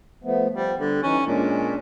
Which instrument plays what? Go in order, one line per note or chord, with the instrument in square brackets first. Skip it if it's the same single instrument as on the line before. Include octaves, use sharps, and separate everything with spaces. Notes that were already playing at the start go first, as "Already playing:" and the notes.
[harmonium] F3 A3 B3
[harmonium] F3 [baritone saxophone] G3
[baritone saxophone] D3 [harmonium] G3
[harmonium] E3 D#4 [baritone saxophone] C#4
[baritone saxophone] A#2 [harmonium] G#3 C#4 D4